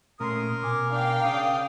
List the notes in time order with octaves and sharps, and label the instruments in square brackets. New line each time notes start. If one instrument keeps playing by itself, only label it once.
[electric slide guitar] A#2 A3 C#4 [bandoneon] A#4 [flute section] C6 D#6
[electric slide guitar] B2 G#5 [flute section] D6
[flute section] D4 [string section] F5 G5
[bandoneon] C#3 D#6 [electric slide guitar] C#4